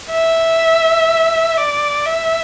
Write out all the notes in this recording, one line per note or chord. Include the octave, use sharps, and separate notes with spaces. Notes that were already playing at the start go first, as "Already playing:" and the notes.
E5
D5
E5